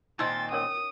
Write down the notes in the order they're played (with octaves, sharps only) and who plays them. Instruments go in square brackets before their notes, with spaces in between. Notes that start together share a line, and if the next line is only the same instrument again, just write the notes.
[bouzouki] A#2 D#3 C4 [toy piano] D#4 E6 [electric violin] A6
[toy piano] C#4 A#4 C#5 [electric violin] D#6